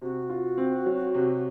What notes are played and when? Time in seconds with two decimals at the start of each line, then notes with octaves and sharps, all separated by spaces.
0.02 C3 F#4
0.30 F4
0.58 C4
0.86 F#3
1.14 C3